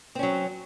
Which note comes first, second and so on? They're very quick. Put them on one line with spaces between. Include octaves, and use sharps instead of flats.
C4 C#4 F#3